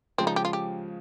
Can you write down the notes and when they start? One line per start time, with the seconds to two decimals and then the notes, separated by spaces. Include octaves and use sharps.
0.18 C#3 F3 G#3 C4
0.27 D#4
0.36 G4
0.45 F4
0.53 G4